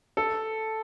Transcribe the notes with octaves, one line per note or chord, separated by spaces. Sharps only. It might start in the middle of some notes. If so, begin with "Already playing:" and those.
A4